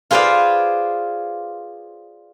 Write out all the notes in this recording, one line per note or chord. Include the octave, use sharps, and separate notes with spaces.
F4 G#4 B4 C5 D5 F5